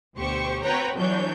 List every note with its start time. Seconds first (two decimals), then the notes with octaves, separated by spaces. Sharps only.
0.17 D2 B2 G4 C5 C#6
0.63 C4 F#4 B4 C#5 G5 A#5
0.96 G1 E3 F#3 D4 C#5 G6